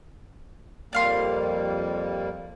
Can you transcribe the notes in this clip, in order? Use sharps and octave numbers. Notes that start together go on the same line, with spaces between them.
F2 G3 A#3 D5 F5 C6